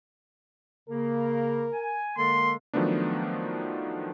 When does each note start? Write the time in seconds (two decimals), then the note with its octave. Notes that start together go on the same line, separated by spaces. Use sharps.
0.89 C#3 A#3 A#4
1.73 G#5
2.18 D3 G#3 A#3 A4 C6
2.73 D#3 F3 F#3 A3 B3 D4